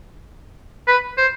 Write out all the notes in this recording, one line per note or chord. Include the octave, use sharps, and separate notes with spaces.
B4
C5